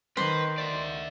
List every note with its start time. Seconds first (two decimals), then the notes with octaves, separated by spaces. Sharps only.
0.17 D#3 B4 C5
0.58 D5 E5